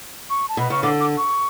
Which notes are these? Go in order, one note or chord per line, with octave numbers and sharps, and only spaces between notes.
C#6
A5
B2 B5
C#3 C#6
D3 D6
D6
C#6